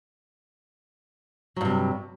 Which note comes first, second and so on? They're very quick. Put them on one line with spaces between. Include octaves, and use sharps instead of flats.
F#3 G2 C3